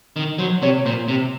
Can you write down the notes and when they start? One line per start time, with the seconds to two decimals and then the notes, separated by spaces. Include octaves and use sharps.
0.16 D#3
0.39 F#3 C5
0.62 C3 C#5
0.86 A#2 C5
1.08 C3